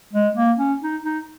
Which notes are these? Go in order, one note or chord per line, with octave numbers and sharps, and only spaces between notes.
G#3
A#3
C#4
D#4
D#4